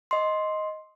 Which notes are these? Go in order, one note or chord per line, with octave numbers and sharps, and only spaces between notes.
D#5 C6